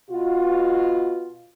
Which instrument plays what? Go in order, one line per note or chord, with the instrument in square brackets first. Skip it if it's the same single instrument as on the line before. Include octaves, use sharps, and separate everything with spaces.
[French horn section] B2 F4 F#4